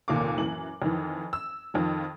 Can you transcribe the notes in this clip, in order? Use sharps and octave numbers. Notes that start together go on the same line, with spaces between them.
F1 D#2 A#2 A#3 D6
F#2 E3 F#7
F2 D#3 E3
E6
F2 D#3 F3